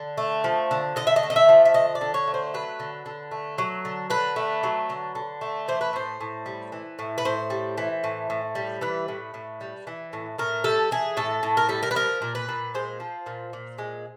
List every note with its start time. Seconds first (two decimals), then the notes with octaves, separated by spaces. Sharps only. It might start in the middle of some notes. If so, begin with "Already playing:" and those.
Already playing: D3
0.17 A3
0.44 F3
0.71 D3
0.96 D3 D#5
1.07 E5
1.16 D#5
1.23 A3
1.30 D#5
1.36 E5
1.49 F3
1.65 E5
1.74 D3 D#5
1.95 D5
2.01 D3
2.14 C#5
2.27 A3
2.34 C5
2.54 F#3 B4
2.80 D3
3.06 D3
3.31 A3
3.58 F#3
3.85 D3
4.10 D3 B4
4.36 A3
4.63 F#3
4.90 D3
5.15 D3
5.41 A3
5.68 E3 C5
5.81 B4
5.93 A2 C5
6.20 A2
6.46 G3
6.72 E3
6.99 A2
7.18 B4
7.25 A2 C5
7.50 G3
7.78 E3
8.04 A2
8.30 A2
8.55 G3
8.81 E3 B4
9.08 A2
9.34 A2
9.61 G3
9.87 E3
10.13 A2
10.38 A2 A#4
10.64 G3 A4
10.91 E3 G#4
11.17 A2 A4
11.43 A2
11.57 A#4
11.69 G3 A4
11.83 A#4
11.91 B4
11.95 F3 A#4
12.22 A#2
12.35 B4
12.49 A#2
12.75 G#3 C5
13.00 F3
13.26 A#2
13.53 A#2
13.78 G#3